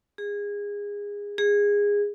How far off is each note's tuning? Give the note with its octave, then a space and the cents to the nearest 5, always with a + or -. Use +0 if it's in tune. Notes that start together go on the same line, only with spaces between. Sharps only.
G#4 -25
G#4 -20